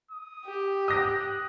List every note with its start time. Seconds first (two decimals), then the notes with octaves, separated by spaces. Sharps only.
0.11 D#6
0.45 G4
0.88 D#6 F#6 A#6